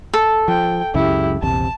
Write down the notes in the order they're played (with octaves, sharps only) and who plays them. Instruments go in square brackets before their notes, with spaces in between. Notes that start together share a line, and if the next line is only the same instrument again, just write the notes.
[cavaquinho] A4
[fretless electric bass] F3 [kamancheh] G5
[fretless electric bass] C#2 F#2 C#3 [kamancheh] E4 G4
[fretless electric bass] A#1 E2 C3 [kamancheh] A5